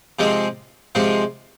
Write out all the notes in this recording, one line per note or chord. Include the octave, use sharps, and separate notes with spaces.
C3 F3 G#3 C4
C3 F3 G#3 C4